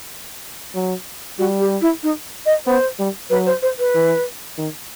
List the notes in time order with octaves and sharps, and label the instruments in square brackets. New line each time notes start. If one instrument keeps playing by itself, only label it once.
[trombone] F#3
[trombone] G3 [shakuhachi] F#4
[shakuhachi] G4
E4
D#4
D#5
[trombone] B3 [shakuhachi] C5
[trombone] G3
[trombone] F#3 [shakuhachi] B4
[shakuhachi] C5
C5
B4
[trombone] E3
D#3